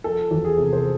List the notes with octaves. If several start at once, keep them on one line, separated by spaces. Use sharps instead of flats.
F3 A4
E2
G#4
C3
C5